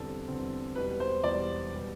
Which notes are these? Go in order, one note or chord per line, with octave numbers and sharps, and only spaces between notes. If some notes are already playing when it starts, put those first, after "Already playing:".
Already playing: E2 D3 G3 C4 A4
E2 D3 G3 C4
E1 E2 B2 G3 B4
C5
E1 E2 B2 G3 D5
B2 G3 B3